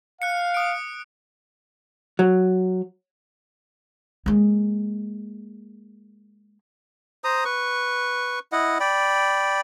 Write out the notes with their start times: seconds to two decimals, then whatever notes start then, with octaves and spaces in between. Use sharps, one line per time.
0.22 F5 F#6 C#7
0.54 D#6 D7
2.19 F#3
4.26 G#3 A#3
7.24 C5 A#5 D#6
7.45 B4 C#6
8.52 E4 D#5 F#5
8.80 D5 G5 B5